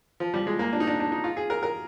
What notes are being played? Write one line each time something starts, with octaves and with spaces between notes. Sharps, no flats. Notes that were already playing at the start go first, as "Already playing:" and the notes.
F3
G3
G#3
A#3
D4
D#4
D4
D4
D#4
F4
G#4
A#4
A#4